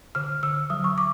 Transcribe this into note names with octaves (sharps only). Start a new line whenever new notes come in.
D3 F6
D3 E6
F#3 D#6
C#6
D6